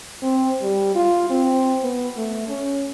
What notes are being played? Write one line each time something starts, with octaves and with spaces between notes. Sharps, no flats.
C4
G3
F4
C4
B3
A3
C#4